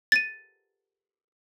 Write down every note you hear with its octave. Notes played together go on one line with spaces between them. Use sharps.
A6 D#7